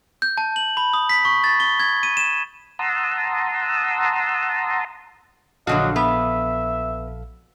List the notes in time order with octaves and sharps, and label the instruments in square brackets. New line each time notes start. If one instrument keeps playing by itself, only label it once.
[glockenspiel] G6
A5
F#7
B5
D#6
B6
C#6
A6
G7
G#6
D#7
E7
[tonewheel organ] F#5 A5 A#5 C6 D#6 E6
[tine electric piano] A#1 A4 F5 [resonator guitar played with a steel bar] D3 F#3 F#4 [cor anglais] D#5
[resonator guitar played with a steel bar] B3 [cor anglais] E5